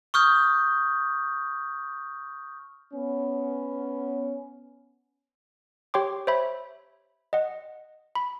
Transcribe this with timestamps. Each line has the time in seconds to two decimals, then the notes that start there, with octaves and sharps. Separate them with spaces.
0.14 C#6 D#6 F6 G6
2.94 B3 C#4
5.94 G4 C#5 G5 C6 D6
6.27 C5 C#5 E5 B5
7.33 D#5 F#5
8.15 B5